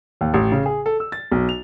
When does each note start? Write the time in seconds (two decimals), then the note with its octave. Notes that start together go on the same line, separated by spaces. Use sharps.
0.21 D#2
0.34 A1
0.52 C#3
0.66 G#4
0.86 A4
1.00 E6
1.12 A6
1.32 B1
1.49 F7